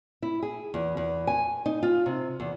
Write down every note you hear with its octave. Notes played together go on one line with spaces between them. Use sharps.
E4
G#4
E2
E2
G#5
D#4
F4
C3
E2